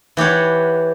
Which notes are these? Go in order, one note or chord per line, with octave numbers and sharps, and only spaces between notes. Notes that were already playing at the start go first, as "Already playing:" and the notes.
E3 G4 C#5 F#5